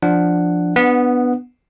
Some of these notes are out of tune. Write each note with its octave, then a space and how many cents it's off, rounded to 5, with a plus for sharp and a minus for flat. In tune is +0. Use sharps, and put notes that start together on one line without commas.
F3 +0 D4 +0 F#5 +0
B3 +0 D4 +0 F#5 -20